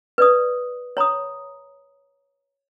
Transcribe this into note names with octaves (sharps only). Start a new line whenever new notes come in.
B4 D5 D#6
C#5 A#5 B5 D#6